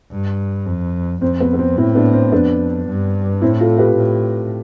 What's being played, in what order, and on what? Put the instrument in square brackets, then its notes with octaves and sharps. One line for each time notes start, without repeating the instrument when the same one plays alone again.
[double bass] G2
F2
[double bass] F2 [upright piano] C4
[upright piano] B3
B3
C4
[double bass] A2 [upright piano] C4 E4
[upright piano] B3 D4
C4
[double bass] F2 [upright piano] B3 D4
[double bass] G2
[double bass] A2 [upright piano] C4 E4
[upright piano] F4 A4
G4 B4
[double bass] A2